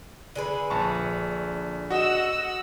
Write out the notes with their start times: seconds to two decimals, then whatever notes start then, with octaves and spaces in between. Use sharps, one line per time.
0.36 D3 G#4 B4
0.70 A#1 A5 C#6
1.91 F#4 D#5 F#5 E6